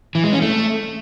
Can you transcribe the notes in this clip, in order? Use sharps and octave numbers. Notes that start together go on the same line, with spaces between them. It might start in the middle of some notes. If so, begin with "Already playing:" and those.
E3
G#3
C#4
A3